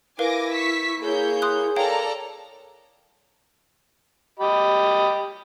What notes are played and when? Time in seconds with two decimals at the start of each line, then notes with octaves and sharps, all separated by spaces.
0.19 E4 A#4 B4 F5 G#5 D6 A#6
0.52 C#6 E6 B6
1.03 A#3 G#4 C#5 G6
1.42 C6 D#6 F#6
1.76 A4 A#4 C#5 D5 F5 G5 A#5
4.39 G4 D#5 B5